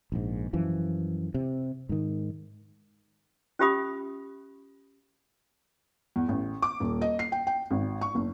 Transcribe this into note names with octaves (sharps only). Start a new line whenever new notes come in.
A#1 G#2
F#2 E3 F3
C3
G#2 D#3
C#4 F4 G4 E5 B5 D#6
E2
A1
D6
D#1
D#5
C7
G5
G5
G#1
C#6
F#1